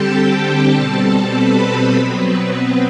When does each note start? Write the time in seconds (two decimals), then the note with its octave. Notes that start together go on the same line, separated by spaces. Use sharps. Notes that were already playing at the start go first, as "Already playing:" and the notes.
Already playing: D3 G3 C4 G4 A4 G5 A5
0.15 A4 A5
0.75 B2 G3 C4
1.34 B4 B5
1.64 A4 A5
1.93 B2 F#3 B3 C4 B4
2.23 B3 B4
2.53 B3 B4